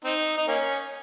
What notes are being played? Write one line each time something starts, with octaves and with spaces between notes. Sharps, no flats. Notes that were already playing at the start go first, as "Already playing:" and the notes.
C4 D#4
D#4
A#3 C#4